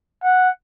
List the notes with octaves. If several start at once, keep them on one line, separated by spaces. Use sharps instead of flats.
F#5